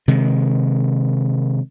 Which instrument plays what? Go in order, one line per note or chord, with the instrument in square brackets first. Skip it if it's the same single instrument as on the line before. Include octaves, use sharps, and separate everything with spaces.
[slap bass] C3 D#3 G#3